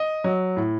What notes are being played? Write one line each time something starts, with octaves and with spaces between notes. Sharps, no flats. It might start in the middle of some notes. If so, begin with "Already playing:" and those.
Already playing: D#5
F#3
A2